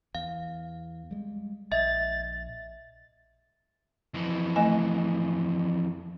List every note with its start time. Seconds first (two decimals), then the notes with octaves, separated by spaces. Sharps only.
0.15 E2 F5
1.11 G3 G#3
1.72 A#1 D#5 E5 A6
4.14 F2 E3
4.56 A3 D#5 G#5